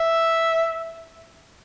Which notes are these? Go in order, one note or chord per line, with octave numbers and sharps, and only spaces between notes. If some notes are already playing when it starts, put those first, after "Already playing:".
Already playing: E5